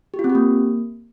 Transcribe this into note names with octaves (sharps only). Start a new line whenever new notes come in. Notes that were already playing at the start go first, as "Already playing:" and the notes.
G4
F4
C4
G4
A#3